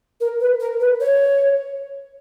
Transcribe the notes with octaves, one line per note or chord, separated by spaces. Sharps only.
A#4
B4
A#4
B4
C#5